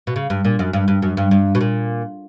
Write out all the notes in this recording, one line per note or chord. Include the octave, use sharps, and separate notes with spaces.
B2
C#3
G2
A#2
F#2
G2
G2
F#2
G2
G2
B2
A#2